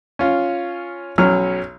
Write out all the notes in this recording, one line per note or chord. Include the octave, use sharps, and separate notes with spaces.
C#4 F4
B1 F#3 C#4 F6